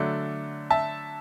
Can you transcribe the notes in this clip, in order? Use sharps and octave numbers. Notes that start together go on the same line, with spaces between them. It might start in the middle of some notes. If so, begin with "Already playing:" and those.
Already playing: D3 F#3 A3 D4
E5 A5